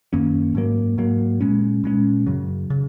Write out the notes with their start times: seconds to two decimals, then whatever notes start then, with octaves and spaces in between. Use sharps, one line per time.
0.13 F#2 D#3 A#3 C#4
0.55 G#2 F#3 A#3
0.98 G#2 F#3 A#3
1.41 A#2 G#3 C#4
1.84 A#2 G#3 C#4
2.26 F#2 C#3 F#3
2.70 C#3